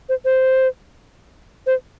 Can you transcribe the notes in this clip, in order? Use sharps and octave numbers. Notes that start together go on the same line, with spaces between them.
C5
C5
C5